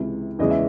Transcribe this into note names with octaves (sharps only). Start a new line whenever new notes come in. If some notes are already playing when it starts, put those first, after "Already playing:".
Already playing: C#2 C3 E3
E2 C#3 E3 G#3 D#5
E5